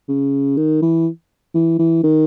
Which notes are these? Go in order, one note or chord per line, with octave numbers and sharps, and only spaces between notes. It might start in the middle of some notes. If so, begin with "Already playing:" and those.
C#3
D#3
E3
E3
E3
D#3